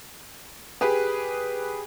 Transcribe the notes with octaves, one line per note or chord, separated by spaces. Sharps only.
G4 G#4 B4